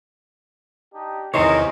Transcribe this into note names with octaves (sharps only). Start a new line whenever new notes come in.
D4 D#4 G4
E2 C3 D#3 E3 G#4 A#4 C5 C#5